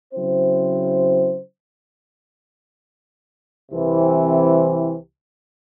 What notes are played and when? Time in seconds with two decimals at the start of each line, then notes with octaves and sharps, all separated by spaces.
0.14 C#3 F#3 C4 E4 C5
3.71 C2 C3 E3 C4